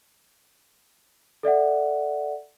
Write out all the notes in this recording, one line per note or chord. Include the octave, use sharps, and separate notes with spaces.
A4 D5 E5 F#5